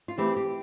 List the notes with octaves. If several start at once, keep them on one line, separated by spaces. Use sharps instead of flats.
F4
E3 A3 C4 E4 G4
G4